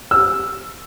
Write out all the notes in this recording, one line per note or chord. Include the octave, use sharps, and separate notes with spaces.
E6